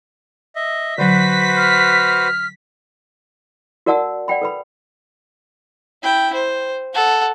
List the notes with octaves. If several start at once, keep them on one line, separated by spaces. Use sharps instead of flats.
D#5 E5
D3 F#3 F#4 B4 C5 B6
F6
F#4 A#4 D5 F#5 A5 E6
D5 F#5 G5 B5
A4 B4 B5
E4 G5
C5
A4 F#5